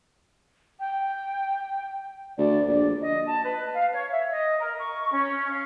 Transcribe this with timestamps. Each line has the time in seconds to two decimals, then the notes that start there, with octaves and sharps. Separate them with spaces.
0.80 G5
2.38 D2 D5
2.68 A#1 D5
3.02 D#5
3.27 A5
3.44 B4
3.73 F5
3.94 C#5
4.12 E5
4.31 D#5
4.60 A#4
4.79 C#6
5.12 C#4
5.51 F5